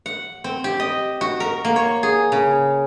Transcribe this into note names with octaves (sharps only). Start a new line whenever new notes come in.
F#5
C4
G4
D#5
F#4
A#4
A#3
C#5
G#4
C#3